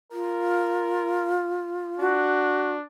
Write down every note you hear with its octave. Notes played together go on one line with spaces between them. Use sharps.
F4 A#4
D4 F#4